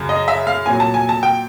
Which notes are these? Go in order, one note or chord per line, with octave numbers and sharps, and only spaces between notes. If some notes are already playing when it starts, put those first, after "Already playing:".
Already playing: F#2 C#3
D#5
E5
F5
A#2 F#3 G#5
A5
G#5
A5
G5